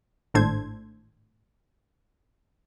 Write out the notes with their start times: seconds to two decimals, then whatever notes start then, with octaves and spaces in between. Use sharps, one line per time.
0.34 G#1 A2 D4 A4 C5 G#6